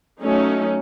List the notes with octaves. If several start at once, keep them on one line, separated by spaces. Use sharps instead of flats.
F#3 A3 C#4 D#4